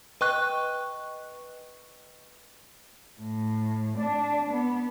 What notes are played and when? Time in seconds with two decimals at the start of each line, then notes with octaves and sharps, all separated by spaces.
0.21 B4 D#5 G5 C#6 F#6
3.20 A2
3.97 D4
4.50 B3